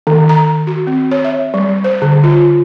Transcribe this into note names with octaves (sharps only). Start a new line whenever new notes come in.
D#3
A#5
F#4
C4
C#5
E5
G3
C5
D3
F4